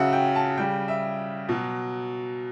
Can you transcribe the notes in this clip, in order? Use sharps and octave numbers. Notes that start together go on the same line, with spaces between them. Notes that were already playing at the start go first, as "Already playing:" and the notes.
Already playing: C#3 F#3 E5 F#5
G5
A5
C#3 G3 G5
E5
B2 F#3